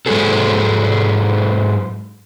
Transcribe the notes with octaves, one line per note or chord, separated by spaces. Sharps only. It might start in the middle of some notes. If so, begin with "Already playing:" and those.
G#2 F#3 G#3 F#4 G#4 A4